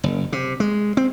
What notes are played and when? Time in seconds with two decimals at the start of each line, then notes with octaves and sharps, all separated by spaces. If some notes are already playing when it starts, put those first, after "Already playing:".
0.04 F#1
0.32 C3
0.60 G#3
0.97 C4